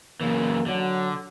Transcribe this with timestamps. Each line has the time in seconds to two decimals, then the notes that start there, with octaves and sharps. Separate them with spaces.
0.21 F#2 C#3 E3 A#3
0.66 D3 F#3